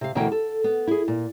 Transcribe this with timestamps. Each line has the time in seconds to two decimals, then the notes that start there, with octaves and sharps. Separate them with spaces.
0.01 C3 F5
0.15 D2 B2 E3 A#4 G5
0.32 A4
0.64 B3
0.87 E4 G#4
1.08 A#2